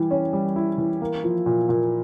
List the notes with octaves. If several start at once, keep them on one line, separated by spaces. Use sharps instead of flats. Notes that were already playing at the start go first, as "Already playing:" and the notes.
Already playing: E3 G3 E4
C#4
G3
E4
E3
A#3
F3
A#2
A#2